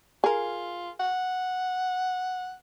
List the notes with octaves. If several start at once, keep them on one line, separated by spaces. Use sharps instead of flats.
F4 G#4 A#4
F#5